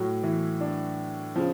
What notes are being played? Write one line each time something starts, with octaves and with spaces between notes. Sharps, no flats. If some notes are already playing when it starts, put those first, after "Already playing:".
Already playing: A2 F#3 F#4
E3 E4
D4
C#3 F3